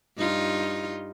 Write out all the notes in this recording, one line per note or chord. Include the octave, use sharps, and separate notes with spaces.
G2 D#4 F4